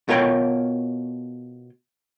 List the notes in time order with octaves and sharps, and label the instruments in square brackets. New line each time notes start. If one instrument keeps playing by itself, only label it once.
[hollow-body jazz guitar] B2 F4 A#4 C#5 G5